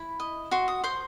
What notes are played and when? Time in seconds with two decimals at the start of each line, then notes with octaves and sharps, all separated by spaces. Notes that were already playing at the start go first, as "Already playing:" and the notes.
Already playing: E4 B5
0.20 D#5
0.51 F#4 C6
0.68 D#6
0.84 C5 C6